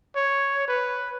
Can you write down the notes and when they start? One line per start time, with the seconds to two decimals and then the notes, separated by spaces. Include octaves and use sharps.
0.16 C#5
0.68 B4